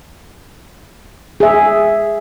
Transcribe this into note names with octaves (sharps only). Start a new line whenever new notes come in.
G#4 E5